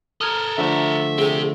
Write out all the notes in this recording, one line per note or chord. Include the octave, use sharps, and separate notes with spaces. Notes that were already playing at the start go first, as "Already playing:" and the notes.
A4 A#4 D#6 F6 G#6
D3 F3 A3 E5
C4 G4 G#4